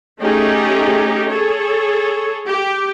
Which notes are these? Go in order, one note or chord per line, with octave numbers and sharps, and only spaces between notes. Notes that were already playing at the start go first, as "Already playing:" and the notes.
A3 C#4 D#4 G4 G#4
G#4 A4 C#5
G4